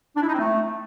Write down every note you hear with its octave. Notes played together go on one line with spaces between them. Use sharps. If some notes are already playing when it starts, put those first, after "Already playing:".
D4
E4
D#4
C4
A3